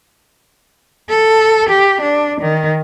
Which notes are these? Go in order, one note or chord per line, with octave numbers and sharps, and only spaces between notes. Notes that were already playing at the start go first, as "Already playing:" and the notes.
A4
G4
D4
D#3